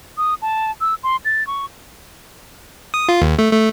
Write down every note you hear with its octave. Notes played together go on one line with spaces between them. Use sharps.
D#6
A5
E6
C6
A6
C#6
D#6
F4
D#2
A3
A3